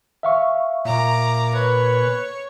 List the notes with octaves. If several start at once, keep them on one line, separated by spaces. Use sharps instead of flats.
E5 F5 C#6
A#2 A#5 D6
B4 C#5